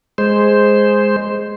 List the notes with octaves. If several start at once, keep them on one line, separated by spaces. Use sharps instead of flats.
G#3 C5